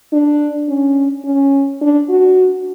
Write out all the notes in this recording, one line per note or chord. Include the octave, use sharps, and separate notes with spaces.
D4
C#4
C#4
D4
F#4